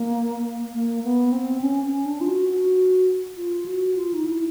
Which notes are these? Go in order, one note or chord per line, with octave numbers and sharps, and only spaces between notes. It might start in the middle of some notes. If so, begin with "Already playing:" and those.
Already playing: A#3
A#3
B3
C4
C#4
C#4
D4
F4
F#4
F#4
F4
F#4
F4
D#4
E4